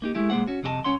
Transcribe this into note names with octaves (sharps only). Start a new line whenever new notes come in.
A#3 D#4 G4
G#3 A3 E4 G4
B1 G#3 A#3 C5 F#5
C#4 F#4
C2 F2 C3 F#4 D#5 A5
C2 C3 C#4 C#5 F#5 C6